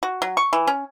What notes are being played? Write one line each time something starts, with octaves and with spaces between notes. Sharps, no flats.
F#4
F#3
C#6
E3
C#4